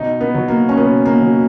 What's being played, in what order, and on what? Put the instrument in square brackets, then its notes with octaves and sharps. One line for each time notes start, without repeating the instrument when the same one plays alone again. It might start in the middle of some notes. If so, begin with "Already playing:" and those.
Already playing: [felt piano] B2 D#4
B3
F#3
A#3
C#4
B2 B3
A#3
F#3